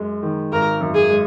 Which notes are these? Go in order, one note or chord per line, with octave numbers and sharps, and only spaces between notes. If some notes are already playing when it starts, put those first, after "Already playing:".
Already playing: F#2 G#3
D#3
G#1 A#4
F#2
G#4
G#3